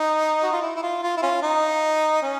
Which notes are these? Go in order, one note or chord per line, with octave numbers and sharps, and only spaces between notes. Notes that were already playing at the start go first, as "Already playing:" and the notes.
Already playing: D#4
F#4
F4
E4
E4
F4
F4
E4
C#4 F4
D#4
C#4